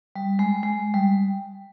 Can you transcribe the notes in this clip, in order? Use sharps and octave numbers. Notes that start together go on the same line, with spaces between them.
G3
G#3
G#3
G3